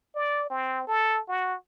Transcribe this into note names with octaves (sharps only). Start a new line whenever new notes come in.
D5
C4
A4
F#4